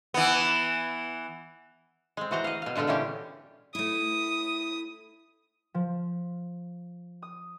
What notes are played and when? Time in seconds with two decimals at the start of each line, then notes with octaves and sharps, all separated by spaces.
0.14 E3 B3
2.17 G#3 C4
2.31 E3 F#4 C5 A#5
2.44 D#5 F5
2.62 B2 F5
2.76 A#2 D3 G#3 F4 A4
2.87 A#2 E3 C#4 G4
3.75 A3 E4 D#6
5.74 F3
7.22 D#6